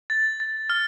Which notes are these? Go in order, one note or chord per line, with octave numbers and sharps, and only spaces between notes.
A6
A6
F6